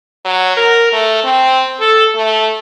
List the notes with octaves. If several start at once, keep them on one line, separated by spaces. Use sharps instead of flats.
F#3
A#4
A3
C4
A4
A3